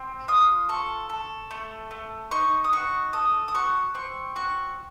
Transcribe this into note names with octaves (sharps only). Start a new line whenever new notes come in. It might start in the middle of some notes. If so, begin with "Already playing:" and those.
Already playing: C4
F4 D#6
A4 C#6
A4
A3
A3
D#4 C#6
D#6
F#4 C#6
A4 D#6
D#6
F#4 C#6
C4 C#6
F#4 C#6